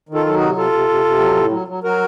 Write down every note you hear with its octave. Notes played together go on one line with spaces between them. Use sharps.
D#3
F4 A4
F#3 A4
D#4 F#4
C3
C3 F4 A4
C3
C3
C3
F#3
A2
F#3
F#3
F#3 F#4 A#4